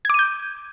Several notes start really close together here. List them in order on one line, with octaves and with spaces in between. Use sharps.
G#6 D6 D#7 G6